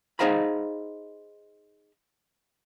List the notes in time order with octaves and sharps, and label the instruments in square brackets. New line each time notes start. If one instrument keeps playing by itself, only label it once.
[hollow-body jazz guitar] D#4 G#4 C5 F5 A#5 B5